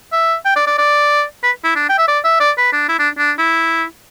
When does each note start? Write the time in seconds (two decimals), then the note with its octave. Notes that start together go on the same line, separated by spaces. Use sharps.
0.13 E5
0.45 G5
0.56 D5
0.67 D5
0.78 D5
1.44 B4
1.64 E4
1.76 D4
1.89 G5
1.98 E5
2.08 D5
2.24 E5
2.40 D5
2.57 B4
2.73 D4
2.89 E4
2.99 D4
3.18 D4
3.38 E4